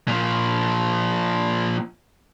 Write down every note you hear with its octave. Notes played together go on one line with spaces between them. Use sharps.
A#2 F3